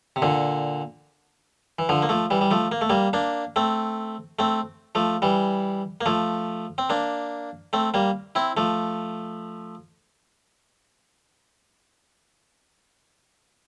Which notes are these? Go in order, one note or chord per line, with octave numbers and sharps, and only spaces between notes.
C3
A#2 D3
E3
D3 F3
A#3
F3 A3
E3 G3
G3
F3 A3
A#3
A3
G3 A#3
A#3 D4
A3 C4
A3 C4
F3 A3
E3 G3
A#3
F3 A3
C4
A#3 D4
A3 C4
G3 A#3
C4 E4
F3 A3